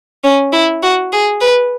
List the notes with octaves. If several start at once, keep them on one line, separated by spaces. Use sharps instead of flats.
C#4
E4
F#4
G#4
B4